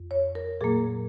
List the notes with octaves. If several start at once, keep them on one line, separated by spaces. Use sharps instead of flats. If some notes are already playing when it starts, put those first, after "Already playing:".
Already playing: F2
C#5
A#4
A#2 F#3 A#3 G#4